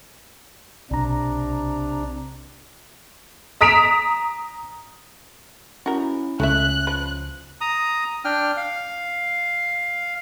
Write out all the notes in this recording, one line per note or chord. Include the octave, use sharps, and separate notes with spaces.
B1 C3 D4 A#5
A#5 D#6 B6 D7 E7 F7
C#4 E4 F#4 A#4
C#2 A3 C#4 A4 E5 F#6
F3 B4
A#5 D#6
D4 G5 F6
F5